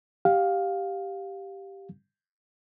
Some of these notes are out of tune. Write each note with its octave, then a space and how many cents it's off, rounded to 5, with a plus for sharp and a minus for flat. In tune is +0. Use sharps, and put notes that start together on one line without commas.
G4 +0 F5 +15